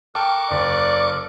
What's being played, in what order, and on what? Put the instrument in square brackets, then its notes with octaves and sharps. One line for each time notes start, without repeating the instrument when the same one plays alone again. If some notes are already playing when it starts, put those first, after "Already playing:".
[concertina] A4 A#4 F#6 [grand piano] G5 A5 [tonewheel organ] C#6 D6
[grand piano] F#1 [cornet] D5